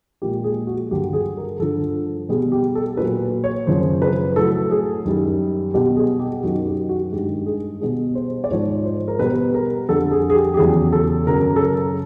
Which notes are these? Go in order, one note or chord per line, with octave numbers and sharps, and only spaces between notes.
A#2 F3 G#3 G4
G#4
F#4
G2 D3 F#3 G4
G#4
A#4
G2 D3 F3 A4
B2 G3 G#4
G4
A4
A#2 F#3 B4
C#5
F#2 C#3 F3 C5
B4
A2 F#3 A4
G#4
F#2 D#3 G3
B2 G3 G4
G#4
G4
F#2 D#3 F#3 F#4
G4
F#4
G2 D#3 G#3 G4
G#4
B2 G3 G#4
C5
D5
G#2 F3 G#3 C#5
C5
A#4
B2 G3 B4
A#4
F2 D3 G3 A4
G#4
G#4
G4
G4
E2 C#3 F#3 G#4
A4
F#2 C#3 F#3 A#4
A4
A#4